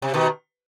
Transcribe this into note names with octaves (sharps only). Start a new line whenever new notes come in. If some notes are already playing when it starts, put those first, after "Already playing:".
C3
B2 D#3